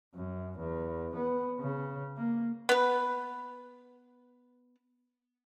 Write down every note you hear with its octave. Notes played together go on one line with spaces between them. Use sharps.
F#2
E2
B3
C#3
A#3
B3 B4